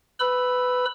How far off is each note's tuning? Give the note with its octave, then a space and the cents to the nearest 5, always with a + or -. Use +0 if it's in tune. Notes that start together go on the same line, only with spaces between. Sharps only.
B4 +20 B5 +0 E6 +0